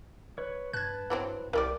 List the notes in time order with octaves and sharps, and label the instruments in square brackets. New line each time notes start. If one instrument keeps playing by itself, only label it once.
[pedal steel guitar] B4 C#5
[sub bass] G2 [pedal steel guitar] B4 A5 [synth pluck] F#6 G#6
[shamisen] E3 F#3 C4
[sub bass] C2 [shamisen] E3 G3 D5 [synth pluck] A#4